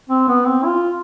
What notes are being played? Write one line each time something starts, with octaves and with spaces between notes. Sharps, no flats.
C4
B3
C4
F4